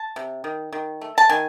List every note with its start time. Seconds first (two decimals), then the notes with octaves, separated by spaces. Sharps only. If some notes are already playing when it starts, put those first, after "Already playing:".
Already playing: A5
0.16 C3
0.44 D#3
0.73 D#3
1.01 A3
1.18 A5
1.29 D#3 G#5